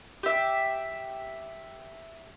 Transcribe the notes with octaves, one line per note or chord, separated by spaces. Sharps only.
G4 E5